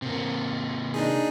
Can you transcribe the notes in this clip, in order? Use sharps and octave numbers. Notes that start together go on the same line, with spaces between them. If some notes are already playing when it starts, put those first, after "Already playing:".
C3 A#3
D4 D#4 G#4